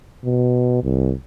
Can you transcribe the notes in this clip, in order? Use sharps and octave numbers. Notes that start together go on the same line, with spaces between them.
B2
C2